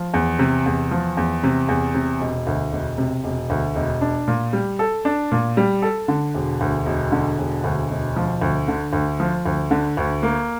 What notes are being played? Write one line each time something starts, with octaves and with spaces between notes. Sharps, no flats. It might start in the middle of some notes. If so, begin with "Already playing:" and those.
Already playing: F3
E2
C3
E2
F3
E2
C3
E2
C3
E1
D2
E1
C3
E1
D2
E1
D4
A#2
G3
A4
D4
A#2
G3
A4
D3
E1
D2
E1
D3
E1
D2
E1
F3
D2
D3
D2
F3
D2
D3
D2
A#3